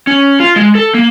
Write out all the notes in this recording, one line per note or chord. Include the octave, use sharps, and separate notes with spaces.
C#4
F4
G#3
A4
A#3